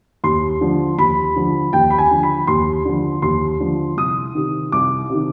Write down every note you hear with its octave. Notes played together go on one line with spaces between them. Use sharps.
D#2 C6
D3 F3
D#2 B5
D3 F3
D#2 G5
B5
G#5
D3 F3
B5
D#2 C6
D3 F3
D#2 C6
D3 F3
C2 D#6
C3 D#3
C2 D6
C3 D#3